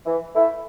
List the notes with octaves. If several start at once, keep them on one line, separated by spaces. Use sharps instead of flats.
E3
A3 E4